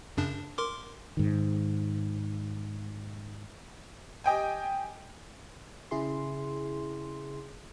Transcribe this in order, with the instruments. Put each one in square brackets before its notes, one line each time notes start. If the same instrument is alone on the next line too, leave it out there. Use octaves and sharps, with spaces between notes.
[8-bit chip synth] F#2 C#3 D4
A#4 C6 D6
[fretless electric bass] G#2 D#3
[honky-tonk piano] G4 D#5 G5 G#5
[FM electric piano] C#3 E4 G#4 C6